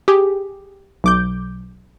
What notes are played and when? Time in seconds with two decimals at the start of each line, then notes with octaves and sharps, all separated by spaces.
0.08 G4 G#4
1.04 B1 D6 G6